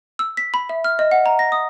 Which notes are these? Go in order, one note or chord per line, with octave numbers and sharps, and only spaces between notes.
E6
B6
B5
E5
F6
D#5
F#5
A#5
A#6
D#6